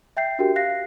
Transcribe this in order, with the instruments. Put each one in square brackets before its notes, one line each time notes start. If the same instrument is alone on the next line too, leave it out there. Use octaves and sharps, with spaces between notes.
[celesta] E5 G5 G6 C7
D4 F#4 G4 A#4 G5
F5 F#6 A#6 C7